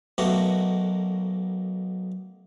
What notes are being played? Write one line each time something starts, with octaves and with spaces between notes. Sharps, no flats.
B1 B2 A3 A#3 F#4